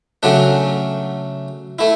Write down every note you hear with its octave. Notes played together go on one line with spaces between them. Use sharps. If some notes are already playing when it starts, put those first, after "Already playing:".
C#3 F#3 A3 D4
A3 E4